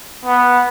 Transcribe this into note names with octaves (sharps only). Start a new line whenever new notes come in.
B3